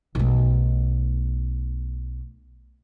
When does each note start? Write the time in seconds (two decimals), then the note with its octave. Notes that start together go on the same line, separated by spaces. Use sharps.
0.15 B1 A3